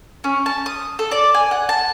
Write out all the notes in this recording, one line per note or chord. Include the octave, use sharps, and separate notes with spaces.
C#4
A5
D#6
A4
D5
G#5
F#5
A5